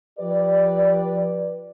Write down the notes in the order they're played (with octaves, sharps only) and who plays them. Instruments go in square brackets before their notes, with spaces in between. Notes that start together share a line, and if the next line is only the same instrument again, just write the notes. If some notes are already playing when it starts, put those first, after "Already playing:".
[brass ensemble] F3 G4 B4 D5